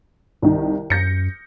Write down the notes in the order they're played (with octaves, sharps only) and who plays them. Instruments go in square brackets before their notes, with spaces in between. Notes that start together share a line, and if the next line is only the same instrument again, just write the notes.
[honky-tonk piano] C2 D#3
[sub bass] F#2 [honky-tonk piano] G6 A#6 C#7